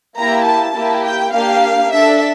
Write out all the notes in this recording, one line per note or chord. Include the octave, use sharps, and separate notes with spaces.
A#3 E4 G4 A#5
A5
A#3 E4 G4
G5
A#3 D4 G4 F5
D4 A4 E5